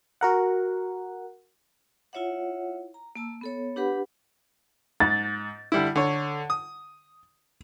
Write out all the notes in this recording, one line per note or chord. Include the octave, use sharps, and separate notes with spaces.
F#4 A#4 F#5
E4 F4 C#5 E5 F#5
A#5
A#3 A5 E6
B3 A4 C#5
D4 G4 B4 F#5 B5
G#2 A6
D3 G3 E4
D3 C#5
D#6